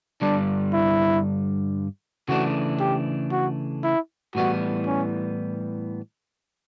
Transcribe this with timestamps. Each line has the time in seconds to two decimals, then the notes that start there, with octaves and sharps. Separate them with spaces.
0.22 G2 D3 G3 D4
0.74 E4
2.28 C#3 E3 A3 D4 F#4
2.80 G4
3.32 F#4
3.84 E4
4.35 A2 E3 G3 B3 F#4
4.87 C#4